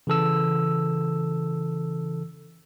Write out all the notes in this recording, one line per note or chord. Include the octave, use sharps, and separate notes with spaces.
C#3 E3 A4 E6